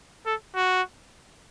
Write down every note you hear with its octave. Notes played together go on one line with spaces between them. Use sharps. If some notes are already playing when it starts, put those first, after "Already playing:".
A4
F#4